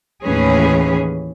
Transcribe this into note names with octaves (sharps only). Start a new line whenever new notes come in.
D#2 A2 E3 C#4 G#4 B4